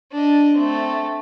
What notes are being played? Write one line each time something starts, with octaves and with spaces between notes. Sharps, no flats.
D4 D#5
A3 C4